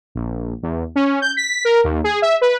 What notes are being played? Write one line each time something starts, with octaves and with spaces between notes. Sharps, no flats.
A#1
E2
C#4
G6
B6
A#4
D#2
G#4
E5
B4